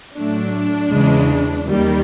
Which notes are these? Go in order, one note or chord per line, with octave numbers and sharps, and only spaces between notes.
A2 F#3 A3 D4
E2 C#3 E3 G#3
D#2 D#3 G3 A#3